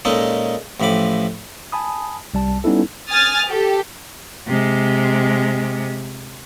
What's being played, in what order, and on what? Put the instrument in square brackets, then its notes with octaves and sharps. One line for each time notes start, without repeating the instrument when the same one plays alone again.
[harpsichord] A#2 G#3 C#4 D#4 A4
A1 A2 F3 B5 D6
[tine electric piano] G#5 A5 B5 D#6
C2 G3 A5
G3 B3 C#4 D#4 E4 A4
[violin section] G#5 D#6 F6 A6
G4 A4
[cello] C3 G#3